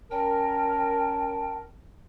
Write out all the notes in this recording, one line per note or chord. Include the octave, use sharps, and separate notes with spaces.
C#4 A#4 G5 A5